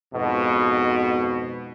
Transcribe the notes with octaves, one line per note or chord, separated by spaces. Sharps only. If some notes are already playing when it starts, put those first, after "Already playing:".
F2 G#2 B2